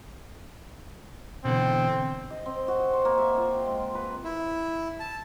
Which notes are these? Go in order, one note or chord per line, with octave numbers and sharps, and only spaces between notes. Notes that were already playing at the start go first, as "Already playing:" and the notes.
B2 D3 E3 C4
D#5
C4
F#4
C5
A#3
E5
F4
G5
G#3
B4
E4
A5